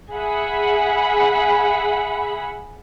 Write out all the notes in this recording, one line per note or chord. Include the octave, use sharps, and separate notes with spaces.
G#4 E5 F#5 B5